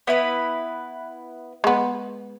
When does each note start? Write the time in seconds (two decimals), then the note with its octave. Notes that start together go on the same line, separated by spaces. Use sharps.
0.07 B3 E4 B4
1.64 G#3 B3